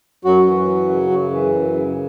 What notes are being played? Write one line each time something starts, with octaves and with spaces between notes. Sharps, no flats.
F#2 F#3 F#4
E3
F#2
C#3
F#2
E3
F#2
C#3